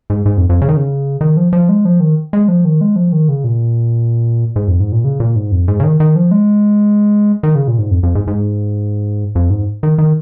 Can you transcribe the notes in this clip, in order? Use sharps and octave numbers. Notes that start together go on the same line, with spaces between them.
G#2
G#2
F2
F2
C#3
D#3
C#3
D#3
F3
F3
G#3
F3
D#3
G#3
F3
D#3
G#3
F3
D#3
C#3
A#2
G#2
F2
G#2
A#2
C#3
A#2
G#2
F2
G#2
C#3
D#3
D#3
F3
G#3
D#3
C#3
A#2
G#2
F2
F2
G#2
G#2
F2
G#2
D#3
D#3